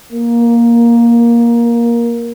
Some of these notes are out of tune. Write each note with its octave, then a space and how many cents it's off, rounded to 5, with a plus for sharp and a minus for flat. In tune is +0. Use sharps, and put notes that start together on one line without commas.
A#3 +10